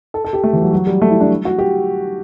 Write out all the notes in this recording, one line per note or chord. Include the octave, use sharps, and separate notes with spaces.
A4
A4
G4
A3
E3
F#3
F#3
G3
A3
E4
D4
F#4
G4